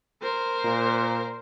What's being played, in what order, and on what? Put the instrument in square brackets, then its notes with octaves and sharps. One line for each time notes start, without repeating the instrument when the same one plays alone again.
[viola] A#4 C5
[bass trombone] A#2